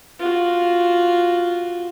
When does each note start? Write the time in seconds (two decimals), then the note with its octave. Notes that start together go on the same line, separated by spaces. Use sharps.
0.19 F4 F#4